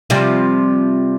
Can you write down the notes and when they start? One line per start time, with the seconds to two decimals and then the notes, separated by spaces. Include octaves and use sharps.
0.10 C3 F3 G3